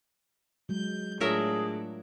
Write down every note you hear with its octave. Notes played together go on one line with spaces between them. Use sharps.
F#3 G#3 G6
A2 F#3 D4 F4 G#4 A#4 E5